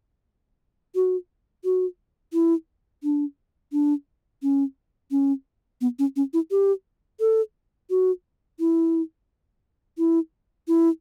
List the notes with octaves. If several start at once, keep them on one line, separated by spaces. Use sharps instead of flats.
F#4
F#4
E4
D4
D4
C#4
C#4
B3
C#4
C#4
E4
G4
A4
F#4
E4
E4
E4